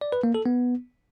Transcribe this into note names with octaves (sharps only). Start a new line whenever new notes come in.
D5
B4
A#3
A4
B3